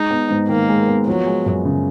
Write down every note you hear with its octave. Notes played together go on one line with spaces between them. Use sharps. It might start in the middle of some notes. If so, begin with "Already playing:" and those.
Already playing: G#3 D#4
B3
G#2
D#3 A#3
G#3
B3
F3 F#3
G#3
F#2
C#3